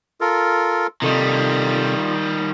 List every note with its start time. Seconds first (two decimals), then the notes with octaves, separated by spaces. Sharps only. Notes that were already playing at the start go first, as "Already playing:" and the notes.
0.21 F4 A4 A#4
1.02 C3 D#3 G3 F4 A4 D#5